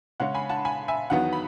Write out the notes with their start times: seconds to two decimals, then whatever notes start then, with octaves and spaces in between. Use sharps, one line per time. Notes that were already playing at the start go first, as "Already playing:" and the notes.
0.20 C#3 G#3 C#4 F#5
0.34 G#5 B5
0.50 F#5 A5
0.65 G#5 B5
0.88 E5 G#5
1.10 E2 D#3 F#3 B3 F#5
1.33 B5